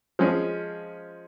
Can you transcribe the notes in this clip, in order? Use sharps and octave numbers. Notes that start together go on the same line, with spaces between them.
F3 G#3 C#4